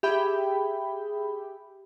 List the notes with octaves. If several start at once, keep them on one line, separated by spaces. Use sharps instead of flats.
G4 G#4 E5 G5 B5